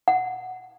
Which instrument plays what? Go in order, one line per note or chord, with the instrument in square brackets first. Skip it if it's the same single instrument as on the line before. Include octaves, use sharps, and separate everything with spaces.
[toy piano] F#5